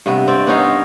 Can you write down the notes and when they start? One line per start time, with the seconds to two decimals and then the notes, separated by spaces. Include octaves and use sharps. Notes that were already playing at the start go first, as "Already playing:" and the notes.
0.06 G2 C3 B3
0.28 C4 D5
0.47 B3 C#4 D#4 F5